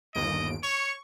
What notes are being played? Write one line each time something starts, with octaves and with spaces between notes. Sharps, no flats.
G1 D#2 D#5 D7
C#5 C#6